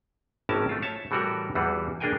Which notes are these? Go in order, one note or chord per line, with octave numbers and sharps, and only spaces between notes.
G#1 A2 E3 C#4 A#4 A5
A3 F4
C#5 E5 A5
A2 E3 G3 F#4 A4 A#4
E2 E3 G3 F4 F#4
A#3 D4 G#4 A#4 G5 G#5